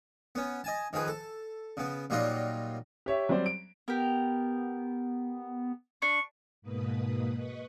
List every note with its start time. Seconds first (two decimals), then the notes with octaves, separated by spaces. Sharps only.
0.35 B3 C#4
0.64 D#5 G#5 A5
0.93 D#3 F3 G#4 B4
1.08 A4
1.77 C#3 B3
2.10 A#2 F#3 G3 D#4 F4 F#4
3.06 G4 C#5 E5
3.29 F#3 G3 C4 C5 D5
3.46 D7
3.88 B3 G4 A#4
6.02 D4 C#6
6.62 G#2 B2 A#3 B4 D#6
7.37 B4 D#5 C#6